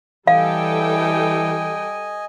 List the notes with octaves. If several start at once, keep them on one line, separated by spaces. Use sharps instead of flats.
E3 G3 A4 D#5 F5 G5 G#5